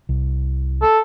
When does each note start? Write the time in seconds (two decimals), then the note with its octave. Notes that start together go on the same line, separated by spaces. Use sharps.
0.09 C2
0.82 A4